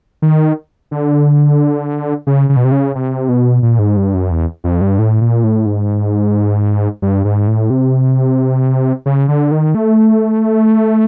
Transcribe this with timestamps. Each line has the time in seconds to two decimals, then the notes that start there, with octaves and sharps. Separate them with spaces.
0.22 D#3
0.91 D3
2.27 C#3
2.49 C#3
2.57 B2
2.65 C3
2.72 C#3
2.95 C3
3.29 B2
3.62 A#2
3.79 G#2
3.97 G2
4.14 F#2
4.31 E2
4.64 F2
4.81 G2
4.99 A2
5.21 A#2
5.44 A2
5.66 G#2
7.02 G2
7.25 G#2
7.48 A2
7.70 C3
9.06 C#3
9.28 D3
9.51 D#3
9.75 A3